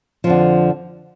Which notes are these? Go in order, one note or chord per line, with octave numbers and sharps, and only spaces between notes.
F2 D3 F3